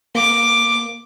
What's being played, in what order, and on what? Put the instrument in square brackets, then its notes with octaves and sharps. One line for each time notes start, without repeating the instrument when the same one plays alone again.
[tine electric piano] A#3 [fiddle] D6